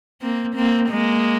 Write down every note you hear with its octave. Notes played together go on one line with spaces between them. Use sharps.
A#3 C4
A#3 C4
G#3 A#3